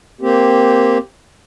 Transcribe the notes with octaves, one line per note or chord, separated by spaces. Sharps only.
A#3 C4 G4